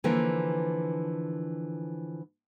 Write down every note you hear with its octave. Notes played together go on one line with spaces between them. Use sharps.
D3 E3 F3 A#3